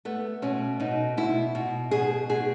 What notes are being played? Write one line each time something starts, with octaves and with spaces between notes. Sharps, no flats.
A3 B3
B2 C#4
B2 D#4
B2 E4
B2
B2 G#4
B2 G#4